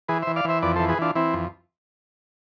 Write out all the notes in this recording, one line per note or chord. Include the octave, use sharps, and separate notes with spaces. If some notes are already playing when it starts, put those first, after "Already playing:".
E3 G#4 B4
C5 E5
E3
D5 F5
E3 C5 E5
F2 B4 D5
E3 A4 C5
G#4 B4
E3 D4 F4
E3 C4 E4
F2